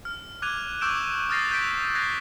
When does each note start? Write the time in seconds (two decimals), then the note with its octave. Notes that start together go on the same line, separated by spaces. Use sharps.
0.05 F6
0.42 D6 F#6 G#6 D#7 F7
0.81 C#6 D6 E6 G6 D7 E7
1.29 D#6 F6 G6 A6 A#6 C7
1.51 G6 A6 B6 D7
1.95 F#6 G#6 A#6 C7